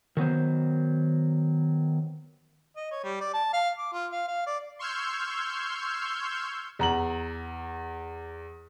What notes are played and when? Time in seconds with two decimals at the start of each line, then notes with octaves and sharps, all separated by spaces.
0.17 D#3 F#3 B3 C5
2.76 D#5
2.91 C#5
3.03 G3
3.21 D5
3.34 A5
3.54 F5
3.78 D6
3.93 F4
4.12 F5
4.28 F5
4.47 D5
4.79 C6 C#6 E6 F6 G6 G#6
6.79 E2 A#5 F#7